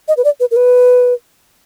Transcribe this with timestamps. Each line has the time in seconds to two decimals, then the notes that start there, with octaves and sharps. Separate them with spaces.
0.08 D#5
0.17 B4
0.24 D5
0.40 B4
0.51 A#4
0.56 B4